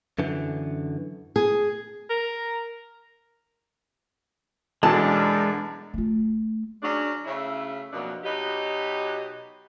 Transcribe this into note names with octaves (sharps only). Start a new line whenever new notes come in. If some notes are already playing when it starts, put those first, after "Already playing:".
F#2 D3 E3
G#4
A#4
F#2 B2 E3 G#3 D4 A4 A5
A3 F4
F#3 G#3 C#4 D4
C#3 F#3 A3 C#4 E4
F2 B2 F#3 A#3 D4
B2 F#3 D#4 G4